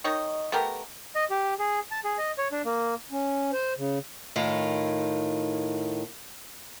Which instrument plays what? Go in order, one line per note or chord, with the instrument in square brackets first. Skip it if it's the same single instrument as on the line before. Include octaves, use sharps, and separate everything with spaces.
[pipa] D#3 D#4 C#5 D#5
A3 B3 G4 A#4
[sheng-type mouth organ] D#5
G4
G#4
A5
G#4
D#5
C#5
D4
A#3
[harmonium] C#4
C5
C#3
[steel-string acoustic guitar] A2 D#3 F4